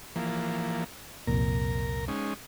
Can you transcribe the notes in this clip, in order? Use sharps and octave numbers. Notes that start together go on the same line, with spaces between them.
E3 F3 A#3
C2 F2 A#2 A#4
G#3 C#4 D#4